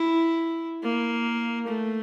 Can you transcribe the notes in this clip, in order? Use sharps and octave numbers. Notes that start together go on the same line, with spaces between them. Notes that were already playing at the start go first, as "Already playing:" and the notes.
Already playing: E4
A#3
A3